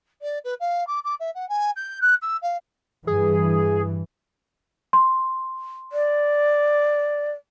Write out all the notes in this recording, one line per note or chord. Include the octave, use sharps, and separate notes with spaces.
D5
B4
F5
D6
D6
E5
F#5
G#5
G6
F#6
E6
F5
G2 E3 G#4
C6
D5